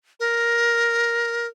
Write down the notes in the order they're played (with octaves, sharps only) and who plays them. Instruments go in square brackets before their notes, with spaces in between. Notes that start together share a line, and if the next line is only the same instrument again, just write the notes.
[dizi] A#4